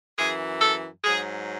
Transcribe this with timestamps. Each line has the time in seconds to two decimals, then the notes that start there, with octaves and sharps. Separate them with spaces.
0.16 F#2 E3 G#4
0.61 A4
1.04 G#2 F#3 G#4